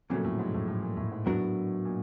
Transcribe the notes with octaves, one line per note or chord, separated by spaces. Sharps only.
F2 A#2 C#3 F#3 A3
A2
G#2
A2
A2
A#2
A2
G#2
A2 F#3 B3 D4 F#4 A#4
A#2